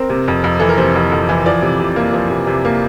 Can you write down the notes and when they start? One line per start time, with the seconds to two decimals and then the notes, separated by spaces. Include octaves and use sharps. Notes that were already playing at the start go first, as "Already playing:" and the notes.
Already playing: C4 A#4
0.10 C3
0.28 F2
0.44 F2
0.60 E3 A4
0.69 A#4
0.78 C3 C5
0.95 F2
1.12 F2
1.29 E3
1.46 F3 D5
1.62 C3
1.80 C3
1.96 A#3
2.14 F3
2.30 C3
2.47 C3
2.65 A#3